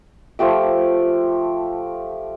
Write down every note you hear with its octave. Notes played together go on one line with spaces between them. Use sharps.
F3 A3 G4 E5